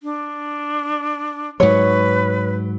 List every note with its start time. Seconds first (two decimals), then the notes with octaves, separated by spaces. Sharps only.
0.03 D4
1.60 G#2 F#3 B4 C#5